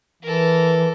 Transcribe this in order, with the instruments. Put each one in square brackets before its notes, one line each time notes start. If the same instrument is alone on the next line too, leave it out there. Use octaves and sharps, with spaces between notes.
[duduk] E3 [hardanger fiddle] A4 A#4